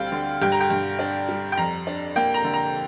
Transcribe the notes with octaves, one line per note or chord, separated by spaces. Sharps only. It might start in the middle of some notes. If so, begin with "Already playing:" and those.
Already playing: D2 G3 C4 F5 G5
D3
G2 G5
A#5
G5
G2
D4
G3
G5
F2 A#5
D4
A#3 G5
A#5
D3
A#5